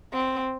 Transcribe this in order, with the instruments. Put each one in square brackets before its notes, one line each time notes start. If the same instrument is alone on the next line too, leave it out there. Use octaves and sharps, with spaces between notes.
[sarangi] C4